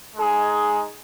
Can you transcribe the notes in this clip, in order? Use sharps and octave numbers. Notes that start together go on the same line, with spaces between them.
G#3 D#4 G#4